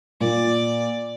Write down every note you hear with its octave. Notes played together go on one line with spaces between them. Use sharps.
A#2 D5